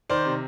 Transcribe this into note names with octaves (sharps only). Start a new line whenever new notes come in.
D#3 C5 D5
C3